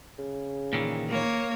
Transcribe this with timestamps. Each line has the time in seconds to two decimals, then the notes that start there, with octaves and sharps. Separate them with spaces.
0.19 C#3
0.73 A#2 D#3 E3
1.09 A#3 C#5